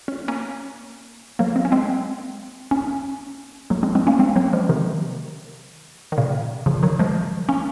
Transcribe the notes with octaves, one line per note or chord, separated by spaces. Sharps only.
C#4
A#3 C#4
F#3 A#3
C4
C#4
G#3 C4
A#3 C#4
F#3 A#3
G#3 C4
G#3 C4
A#3 C#4
G#3 C4
F#3 A#3
F3 G#3
C3 D#3
D#3
A#2 C#3
C#3 F3
D#3 F#3
F3 G#3
A#3 C#4